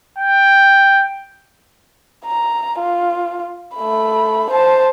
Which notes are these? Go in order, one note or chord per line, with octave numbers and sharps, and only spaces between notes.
G5
A#5
F4
A3 B5
C5 A5